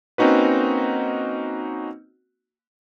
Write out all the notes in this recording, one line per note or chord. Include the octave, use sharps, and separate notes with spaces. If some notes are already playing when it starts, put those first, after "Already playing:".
A#3 C4 C#4 D#4 F#4 B4